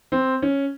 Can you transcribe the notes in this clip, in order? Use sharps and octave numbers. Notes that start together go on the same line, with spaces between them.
C4
C#4